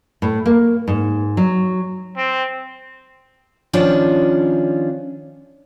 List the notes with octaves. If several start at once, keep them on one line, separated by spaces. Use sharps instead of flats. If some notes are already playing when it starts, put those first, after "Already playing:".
A2
A#3
G#2
F#3
C4
D#3 F3 C#4 D4 F4